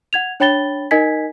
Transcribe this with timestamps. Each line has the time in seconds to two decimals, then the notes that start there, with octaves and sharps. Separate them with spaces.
0.13 F#5 G#6 F7
0.40 D4 C#5 G5 B5 A6 G7
0.91 D#4 A#4 D#5 G#5 G#6 B6